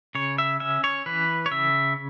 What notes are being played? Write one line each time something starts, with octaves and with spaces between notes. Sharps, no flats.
C#3 C#5
E5
C#4 E5
C#5
E3 B4
C#5
C#3 E5